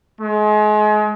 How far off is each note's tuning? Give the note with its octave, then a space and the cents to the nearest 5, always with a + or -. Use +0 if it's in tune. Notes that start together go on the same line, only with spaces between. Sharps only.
G#3 +35